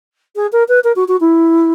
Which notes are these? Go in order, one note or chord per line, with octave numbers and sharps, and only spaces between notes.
G#4
A#4
B4
A#4
F#4
F#4
E4